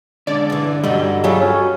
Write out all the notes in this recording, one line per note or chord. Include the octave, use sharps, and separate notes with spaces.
D3 G#3 C#4 D5
G2 E3
G2 D3 F#3 G3 D#5
C#3 F#3 F4 G4 A4
C#4